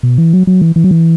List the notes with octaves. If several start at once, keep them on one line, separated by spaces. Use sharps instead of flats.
B2
E3
F#3
F#3
E3
E3
F#3
E3